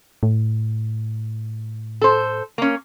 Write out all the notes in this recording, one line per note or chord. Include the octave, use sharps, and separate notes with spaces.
A2
A4 C5
A#3 C#4